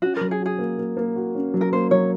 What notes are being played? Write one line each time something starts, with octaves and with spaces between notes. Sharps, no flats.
C#4 F#4
F#3 A#4
G#4
F#4
G#4
A#3
A#3
A#3
F#4
C#4
F#3
A#4
A#3 C5
F#3 C#5